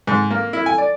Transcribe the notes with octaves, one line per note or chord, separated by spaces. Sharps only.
G#2
A#3
E4
G#5
D5